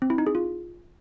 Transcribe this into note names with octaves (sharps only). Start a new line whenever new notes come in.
C4
E4
D#4
G#4
F4